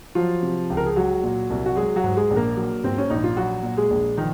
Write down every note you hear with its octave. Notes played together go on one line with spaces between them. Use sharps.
F3 F#3 F4
C3
C#2
A#4
G#4
F#3 G#3 F#4
A#2
C2
F#4
F#3 G#3 G#4
F#3 F#4
G#2
G#3 G#4
A#1
A#3 A#4
F#3
G#2 C4
C#4
A#1 D#4
F4
F#3 F#4
A#2
G#3 G#4
A#1
D#3 F3 D#4